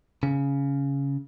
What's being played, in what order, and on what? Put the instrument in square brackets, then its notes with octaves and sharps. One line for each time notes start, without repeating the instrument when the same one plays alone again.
[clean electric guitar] C#3